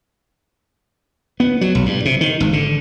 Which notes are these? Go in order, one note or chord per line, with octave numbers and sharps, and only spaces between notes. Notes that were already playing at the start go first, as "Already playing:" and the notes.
B3
F#3
B1
G2
C3
D#3
G#1
D3